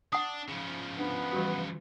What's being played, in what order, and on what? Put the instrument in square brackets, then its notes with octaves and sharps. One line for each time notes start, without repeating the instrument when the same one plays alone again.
[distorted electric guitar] D4 [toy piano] F#5 D#6
[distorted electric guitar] C#3 F3
[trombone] B3 [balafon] D4
[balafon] E3 G3 F#4